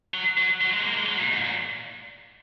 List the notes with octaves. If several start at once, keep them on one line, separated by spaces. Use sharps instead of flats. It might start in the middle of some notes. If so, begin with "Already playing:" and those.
F#3
F#3
F#3
G#3
A#3
G#3
F#3
A#2
G#2
A#2